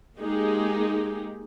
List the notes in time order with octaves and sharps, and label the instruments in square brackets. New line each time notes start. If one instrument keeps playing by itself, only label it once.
[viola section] G#3 A#3 D#4 G4 G#4